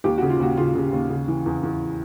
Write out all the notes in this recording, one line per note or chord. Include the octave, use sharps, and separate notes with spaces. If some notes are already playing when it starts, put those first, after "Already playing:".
D#2 G4
C#3 F#4
F4
D#2 F#4
C#3 F4
C#3
D#2
C#3
E3
E2
E2